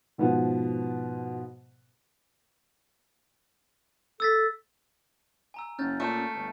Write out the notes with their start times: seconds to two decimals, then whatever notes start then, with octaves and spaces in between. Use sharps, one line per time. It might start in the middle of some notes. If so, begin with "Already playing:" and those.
0.18 G#2 B2 F3 B3
4.20 A4 E6 A6 B6
5.54 G#5 A#5 E6
5.79 F#1 C#4 F6 G6 A6
6.00 A#2 A3 C#6 E7
6.34 G1